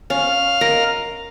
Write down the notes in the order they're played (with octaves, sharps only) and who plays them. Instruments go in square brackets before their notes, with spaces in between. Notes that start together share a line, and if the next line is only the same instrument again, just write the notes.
[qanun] C#4 [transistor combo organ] F5
[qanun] A#4 D#5 A#5